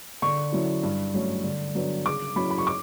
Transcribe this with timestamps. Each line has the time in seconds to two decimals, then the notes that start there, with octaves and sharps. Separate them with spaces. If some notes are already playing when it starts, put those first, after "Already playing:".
0.22 D3 C#6
0.52 F#3 C#4 E4
0.83 G2
1.14 F#3 A3 C#4
1.44 D3
1.75 F#3 B3 D4
2.06 C#3 D6
2.36 F#3 C#4 E4 B5
2.51 B5
2.58 C#6
2.67 D6